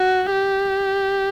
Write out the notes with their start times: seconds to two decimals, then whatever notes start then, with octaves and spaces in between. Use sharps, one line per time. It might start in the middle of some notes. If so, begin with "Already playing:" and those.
Already playing: F#4
0.32 G4